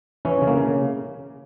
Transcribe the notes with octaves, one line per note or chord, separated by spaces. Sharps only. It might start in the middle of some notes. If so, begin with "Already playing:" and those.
E3 C#4
C#3
A#3
C#3